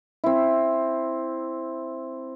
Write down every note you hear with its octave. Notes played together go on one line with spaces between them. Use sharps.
C4 E4